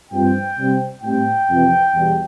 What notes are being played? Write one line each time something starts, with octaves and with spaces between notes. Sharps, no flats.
G2 F3 C4 G5
C3 G3 C4
A2 G3 C4 G5
F2 C3 E3
E2 B2 G3